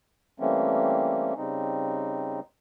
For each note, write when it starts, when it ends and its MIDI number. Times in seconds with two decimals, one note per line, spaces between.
0.40 1.34 52
0.40 1.34 55
0.40 1.34 57
0.40 1.34 58
0.40 1.34 60
0.40 1.34 61
1.37 2.40 49
1.37 2.40 55
1.37 2.40 60
1.37 2.40 63